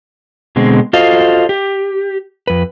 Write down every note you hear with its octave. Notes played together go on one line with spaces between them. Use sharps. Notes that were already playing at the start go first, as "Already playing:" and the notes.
B2 D3 G#3 C4
F4 F#4 A4 C5 D#5 F5
G4
F2 B4